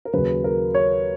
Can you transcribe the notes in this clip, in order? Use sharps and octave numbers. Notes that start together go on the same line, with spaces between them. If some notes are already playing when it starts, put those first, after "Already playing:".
A#4
D#2 C#3 F#3 B4
A#4
C#5